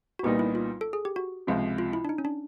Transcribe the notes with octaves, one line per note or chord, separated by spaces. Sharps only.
F#4
C2 A#2 G3 B3 D#4 G4
E4
F4
A4
G#4
G4
F#4
C#2 C3 F3
F4
E4
D4
D#4
C#4
D4